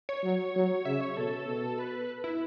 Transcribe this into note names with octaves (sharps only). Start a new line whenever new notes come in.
C#5
F#3
F#3
C#3 E5
C#5
B2 A4
B2
B4
E4